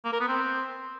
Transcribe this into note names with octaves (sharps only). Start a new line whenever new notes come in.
A#3
A#4
B3
C4